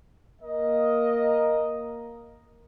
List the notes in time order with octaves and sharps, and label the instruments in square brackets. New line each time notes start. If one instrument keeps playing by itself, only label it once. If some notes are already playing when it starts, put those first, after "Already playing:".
[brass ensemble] A#3 A#4 D#5